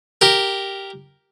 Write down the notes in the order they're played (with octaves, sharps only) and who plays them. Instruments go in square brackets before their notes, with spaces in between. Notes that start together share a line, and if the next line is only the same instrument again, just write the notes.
[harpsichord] G4 A#4